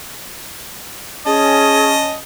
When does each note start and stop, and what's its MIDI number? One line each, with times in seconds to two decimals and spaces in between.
1.26 2.19 61
1.26 1.91 68
1.26 2.16 75
1.26 2.15 81